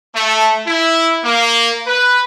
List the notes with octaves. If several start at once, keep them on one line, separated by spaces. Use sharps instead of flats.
A3
E4
A#3
B4